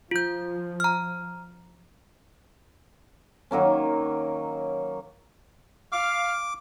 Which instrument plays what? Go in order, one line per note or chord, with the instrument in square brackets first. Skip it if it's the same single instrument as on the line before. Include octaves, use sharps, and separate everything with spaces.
[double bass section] F3 [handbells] F4 G6
[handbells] A#5 F6
[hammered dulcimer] D#3 F#3 A#3 C#4
[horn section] F5 [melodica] D6